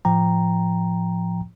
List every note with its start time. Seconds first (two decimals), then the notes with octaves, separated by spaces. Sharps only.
0.05 A2 F3 G5 A#5